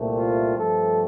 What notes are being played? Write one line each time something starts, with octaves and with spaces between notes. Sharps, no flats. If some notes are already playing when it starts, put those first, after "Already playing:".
Already playing: C2 A#2 A3 C4
F4
G2 F3 A3 C4 A4